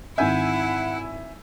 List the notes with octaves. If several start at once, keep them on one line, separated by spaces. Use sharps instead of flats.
G#1 E4 E5 F#5 G#5 G6